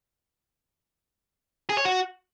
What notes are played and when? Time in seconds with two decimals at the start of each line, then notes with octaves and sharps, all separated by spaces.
1.69 G#4
1.77 C#5
1.85 F#4